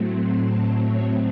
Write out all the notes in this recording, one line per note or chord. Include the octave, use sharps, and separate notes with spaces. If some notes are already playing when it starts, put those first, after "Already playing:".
Already playing: A2 F#3 A3 C4
C6
A5
C#5